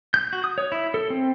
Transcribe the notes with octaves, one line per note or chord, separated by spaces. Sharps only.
G6
F#4
D#6
C#5
E4
A4
C4